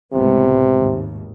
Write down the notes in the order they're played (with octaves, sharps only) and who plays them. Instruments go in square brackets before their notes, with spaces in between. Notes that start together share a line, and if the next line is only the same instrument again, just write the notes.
[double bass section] C#2 A2 B3 [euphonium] C3
[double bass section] G#1 D#2